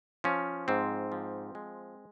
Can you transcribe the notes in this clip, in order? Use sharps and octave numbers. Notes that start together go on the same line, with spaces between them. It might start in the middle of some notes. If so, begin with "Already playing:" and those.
F3 C#4
G#2 C4
F3
G#3